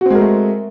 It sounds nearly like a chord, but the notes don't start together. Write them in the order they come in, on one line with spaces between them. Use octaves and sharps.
F#4 C4 G#3 A#4 A3